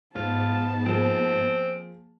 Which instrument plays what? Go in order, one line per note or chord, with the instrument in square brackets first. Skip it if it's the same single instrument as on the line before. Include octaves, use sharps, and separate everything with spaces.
[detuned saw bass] G#2 [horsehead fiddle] B3 A5 [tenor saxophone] F4
[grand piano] F3 A#3 G#4 [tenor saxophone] C4